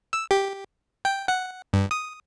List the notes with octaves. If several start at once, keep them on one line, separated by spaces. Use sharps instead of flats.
E6
G4
G5
F#5
G2
D#6